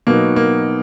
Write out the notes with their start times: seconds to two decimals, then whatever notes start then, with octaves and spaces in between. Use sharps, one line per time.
0.07 B2 F#3 A#3 B3 D#4
0.36 A#3